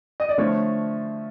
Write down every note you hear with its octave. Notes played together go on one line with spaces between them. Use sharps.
D#5
D5
D3 F3 A3 C#5